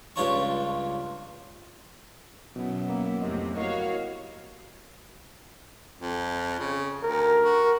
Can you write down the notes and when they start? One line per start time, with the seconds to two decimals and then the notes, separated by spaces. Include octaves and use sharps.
0.16 C#2 G2 F4 C#5 A5 C#6
2.56 F#2 B2 B3 E4
2.89 A#3
3.21 F2 A2 C3 D#5
3.57 E4 F#4 A#4 C#5 D#5 F5
6.01 F2
6.59 C#3
7.04 D2 A#4
7.44 F#4